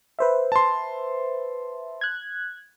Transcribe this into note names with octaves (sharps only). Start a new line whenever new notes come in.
B4 C5 E5
A5 C6
F#6 G#6